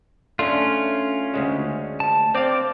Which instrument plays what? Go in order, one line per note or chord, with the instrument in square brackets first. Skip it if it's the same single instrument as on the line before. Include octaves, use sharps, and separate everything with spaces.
[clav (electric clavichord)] A3 D4 [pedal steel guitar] C#4 F4
[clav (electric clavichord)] D2 C#3 G#3
[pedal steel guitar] A5
[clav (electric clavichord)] C4 F5 [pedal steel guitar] C5 D5 D6